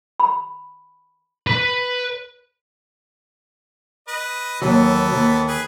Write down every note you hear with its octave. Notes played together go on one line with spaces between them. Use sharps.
B5
B4 B5
B4 D#5
D#2 E3 F#3 B3 A4
D#2
G#4 B4